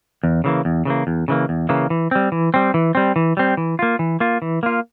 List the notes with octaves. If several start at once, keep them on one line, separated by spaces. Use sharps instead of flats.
E2
C#3 E3 A#3
E2
C#3 E3 A#3
E2
C#3 E3 A#3
E2
C#3 E3 A#3
E3
G3 C4
E3
G3 C4
E3
G3 C4
E3
G3 C4
E3
A#3 F4
E3
A#3 F4
E3
A#3 F4